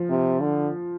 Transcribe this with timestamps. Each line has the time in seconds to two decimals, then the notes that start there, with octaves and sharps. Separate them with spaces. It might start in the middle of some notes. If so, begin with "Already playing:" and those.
Already playing: F3
0.09 C3
0.41 D3